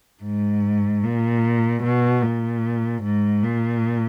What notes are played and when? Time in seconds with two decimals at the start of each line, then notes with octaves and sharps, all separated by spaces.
0.23 G#2
1.03 A#2
1.83 B2
2.23 A#2
3.03 G#2
3.43 A#2